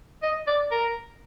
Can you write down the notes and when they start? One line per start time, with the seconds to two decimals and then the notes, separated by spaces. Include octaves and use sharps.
0.23 D#5
0.47 D5
0.71 A#4